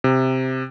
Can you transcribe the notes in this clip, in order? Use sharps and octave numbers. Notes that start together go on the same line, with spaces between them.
C3